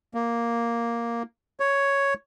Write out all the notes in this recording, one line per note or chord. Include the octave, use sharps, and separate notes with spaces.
A#3
C#5